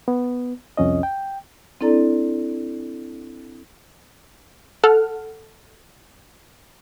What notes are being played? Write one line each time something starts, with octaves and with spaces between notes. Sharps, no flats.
B3
C2 F2 C#4 D#5
G5
C4 D4 E4 A4 D5 A#5
A4 F#5 F6